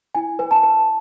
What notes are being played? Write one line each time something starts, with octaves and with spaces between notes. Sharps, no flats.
E4 G#5
B4 G#5
A5
B4